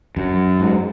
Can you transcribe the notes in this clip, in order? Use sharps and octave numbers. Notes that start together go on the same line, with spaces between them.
F#2
G#2